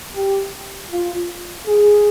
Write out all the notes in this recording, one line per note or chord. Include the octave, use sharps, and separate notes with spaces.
G4
F4
G#4